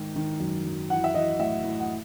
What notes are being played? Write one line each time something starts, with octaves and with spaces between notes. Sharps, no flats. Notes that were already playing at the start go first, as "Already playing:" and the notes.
Already playing: G#2 D#3
D#3
F#2
F#2
E3 F#5
E5
E3 D#5
A2 E5
A2
F#5